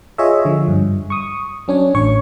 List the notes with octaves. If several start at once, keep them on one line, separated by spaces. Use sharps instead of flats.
F4 G#4 C#5 D#5 E5
D3 F3
G2
C#6 D#6
F#3 C#4 D4 C#5
A1 C#5 C#6